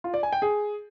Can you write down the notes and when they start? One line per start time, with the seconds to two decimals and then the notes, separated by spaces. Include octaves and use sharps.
0.04 F4
0.14 D5
0.23 G#5
0.32 G5
0.42 G#4